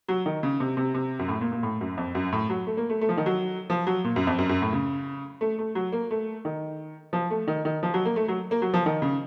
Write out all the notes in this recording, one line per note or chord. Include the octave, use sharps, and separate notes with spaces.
F#3
D#3
C#3
C3
C3
C3
F#2
A2
A#2
A#2
A2
F#2
F2
F#2
A2
F#3
A3
A#3
A3
A3
F3
D#3
F#3
F3
F#3
A#2
F#2
F2
F#2
F#2
A2
C#3
A3
A3
F#3
A#3
A3
D#3
F3
A3
D#3
D#3
F3
F#3
A#3
A3
F#3
A#3
F#3
F3
D#3
C#3